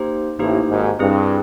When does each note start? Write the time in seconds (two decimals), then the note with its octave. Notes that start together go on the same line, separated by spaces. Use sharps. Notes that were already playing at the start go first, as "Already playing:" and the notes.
Already playing: A#3 D#4 G4 C5
0.39 A1 A2 A#3 D#4 G4 C5
0.69 G#1 G#2
0.99 G2 C4 E4 G#4